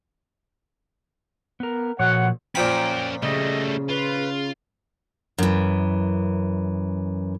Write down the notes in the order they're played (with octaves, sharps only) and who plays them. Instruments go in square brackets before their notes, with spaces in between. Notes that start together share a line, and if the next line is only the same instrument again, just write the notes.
[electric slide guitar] B3 A#4
[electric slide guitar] A#2 F3 [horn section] F#4 C#5 F#5
[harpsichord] A#2 F3 B5 [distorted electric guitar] C#4 A#4 [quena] G5
[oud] C#3 [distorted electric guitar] G3 A3 [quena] D#5
[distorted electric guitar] F4 [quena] B4
[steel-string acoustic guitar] F#2 E3